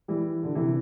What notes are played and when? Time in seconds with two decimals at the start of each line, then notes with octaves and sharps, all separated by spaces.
0.08 E3 G3
0.43 D3
0.55 C3 E3